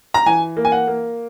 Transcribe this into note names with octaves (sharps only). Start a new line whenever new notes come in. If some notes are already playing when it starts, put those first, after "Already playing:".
A#5
E3 G#5
A#3
G#5
F#5
A#3